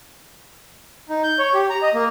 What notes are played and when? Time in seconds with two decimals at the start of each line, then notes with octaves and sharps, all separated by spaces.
1.09 D#4
1.24 G6
1.39 C#5
1.54 G4
1.70 A#5
1.82 D#5
1.94 A#3